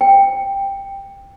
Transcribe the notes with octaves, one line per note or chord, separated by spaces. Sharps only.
G5